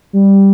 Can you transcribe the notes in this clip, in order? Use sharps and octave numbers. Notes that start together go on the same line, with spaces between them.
G3